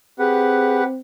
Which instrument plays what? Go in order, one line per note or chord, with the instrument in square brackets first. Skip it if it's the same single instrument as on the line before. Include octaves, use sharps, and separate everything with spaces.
[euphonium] C4 [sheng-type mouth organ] G4 B4 F#5 [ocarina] G#4